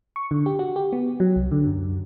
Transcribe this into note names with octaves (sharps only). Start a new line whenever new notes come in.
C#6
D3
G4
F#4
G4
B3
F#3
C2
D3
F#2